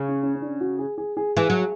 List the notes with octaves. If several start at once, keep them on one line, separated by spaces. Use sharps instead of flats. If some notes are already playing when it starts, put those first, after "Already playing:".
Already playing: C#3
C#4
C#4
C#4
D4
F#4
G#4
G#4
G#4
E3 G#4
F#3